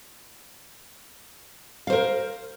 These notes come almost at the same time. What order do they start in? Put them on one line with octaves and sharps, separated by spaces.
F5 C5 A#4